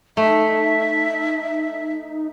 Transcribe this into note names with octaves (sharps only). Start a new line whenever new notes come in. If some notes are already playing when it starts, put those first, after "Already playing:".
A3 D#4 E5